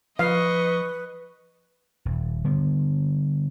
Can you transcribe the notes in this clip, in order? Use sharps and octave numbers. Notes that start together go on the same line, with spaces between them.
F3 B4 D#5 F5 C#6
D#1
D3 G3 B3